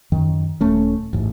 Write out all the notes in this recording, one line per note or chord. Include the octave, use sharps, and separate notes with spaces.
F#2 D#3
D#1 A3 C#4
A1 G#2